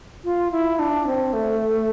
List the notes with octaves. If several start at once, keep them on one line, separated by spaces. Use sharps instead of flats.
F4
E4
D4
C4
A3